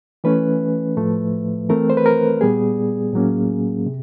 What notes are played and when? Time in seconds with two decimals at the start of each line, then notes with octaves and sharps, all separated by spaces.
0.24 E3 A3 C#4 B4
0.97 A2 F3 A3
1.69 E3 A3 C4 A#4
1.90 C5
1.97 B4
2.06 A#4
2.41 A#2 G3 B3 G#4
3.13 A2 F#3 A#3 C#4
3.86 C3